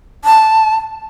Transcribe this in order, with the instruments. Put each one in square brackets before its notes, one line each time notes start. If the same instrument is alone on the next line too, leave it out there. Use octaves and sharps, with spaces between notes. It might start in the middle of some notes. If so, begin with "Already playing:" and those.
[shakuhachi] A5